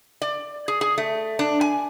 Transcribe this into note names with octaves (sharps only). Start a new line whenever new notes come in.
D5
G#4
G#4
A3
D4
G#5